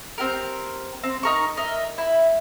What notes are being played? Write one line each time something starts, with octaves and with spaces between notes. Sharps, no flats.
C4 G4 A#4
C4
D#4 A#4 C#6
A#4 D#5 E5
E4